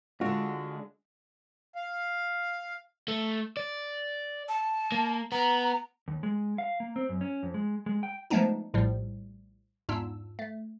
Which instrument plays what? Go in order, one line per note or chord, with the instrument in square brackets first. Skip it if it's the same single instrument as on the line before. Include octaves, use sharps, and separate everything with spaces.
[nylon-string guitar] D3 D4 [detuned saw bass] G#3 [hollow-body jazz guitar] F4 F#4
[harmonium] F5
[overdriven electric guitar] A3
D5
[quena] A5
[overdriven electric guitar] A#3
[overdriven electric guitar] B3 [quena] A#5
[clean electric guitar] D#2
G#3
F5
A#3
C4
F#2
C#4
F2
G#3
G#3
G5
[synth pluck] F3 G#3 A3 B3 D4 D#4
A#1 A2 F3 G3
E2 G#2 D4 F4 E6
A3